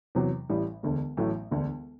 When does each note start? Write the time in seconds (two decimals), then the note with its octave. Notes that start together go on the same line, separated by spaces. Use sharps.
0.15 E2 C3 F#3
0.49 A1 A2 G3
0.83 E1 D2 D3
1.17 A1 A2 F#3 A3
1.51 E1 D2 D3